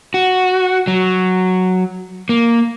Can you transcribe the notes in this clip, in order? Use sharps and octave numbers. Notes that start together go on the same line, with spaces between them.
F#4
F#3
A#3